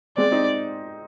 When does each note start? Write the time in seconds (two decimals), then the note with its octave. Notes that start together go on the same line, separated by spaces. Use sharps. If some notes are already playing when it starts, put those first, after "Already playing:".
0.17 G#3 C4 D5
0.32 C4 D#4